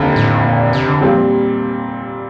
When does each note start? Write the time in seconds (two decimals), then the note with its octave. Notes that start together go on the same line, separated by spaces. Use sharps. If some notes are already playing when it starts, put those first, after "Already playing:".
Already playing: F1 D#2 D3
0.16 A2
0.44 A#2
0.73 C3
0.88 D3
1.01 A#2 F3 G3 C4